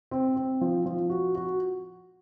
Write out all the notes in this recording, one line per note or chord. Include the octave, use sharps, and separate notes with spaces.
C4
C4
F3
F3
F#4
F#4